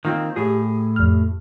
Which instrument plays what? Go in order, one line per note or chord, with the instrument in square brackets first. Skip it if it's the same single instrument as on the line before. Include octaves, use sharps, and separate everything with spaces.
[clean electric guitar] D#3 A#3 C4 [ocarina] F4
[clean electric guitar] A2 G#4 [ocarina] G4
[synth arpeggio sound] F2 F6